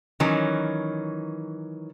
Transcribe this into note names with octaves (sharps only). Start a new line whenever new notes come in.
D#3 E3 F#3 C#4